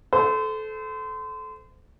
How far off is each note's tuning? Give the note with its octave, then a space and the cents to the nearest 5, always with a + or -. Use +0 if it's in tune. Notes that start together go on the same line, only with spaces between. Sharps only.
A4 -20 C5 -35